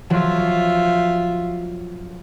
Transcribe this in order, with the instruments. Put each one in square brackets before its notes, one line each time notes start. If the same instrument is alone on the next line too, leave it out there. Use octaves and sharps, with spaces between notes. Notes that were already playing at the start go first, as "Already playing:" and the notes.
[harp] F3 F#3 [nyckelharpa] F4 E5